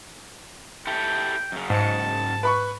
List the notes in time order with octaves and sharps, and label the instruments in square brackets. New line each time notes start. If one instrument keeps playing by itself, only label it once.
[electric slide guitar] E4 G4 A4 [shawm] G5
[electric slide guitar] F#2 C#3
[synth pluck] G#2 C#7 [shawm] A5
[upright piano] B4 B5 C#6